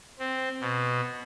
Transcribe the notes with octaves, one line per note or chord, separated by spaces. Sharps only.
C4
B2